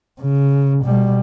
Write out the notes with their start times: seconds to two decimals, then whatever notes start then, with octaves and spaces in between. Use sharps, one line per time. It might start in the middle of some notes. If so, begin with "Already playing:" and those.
0.21 C#3
0.85 B2 G3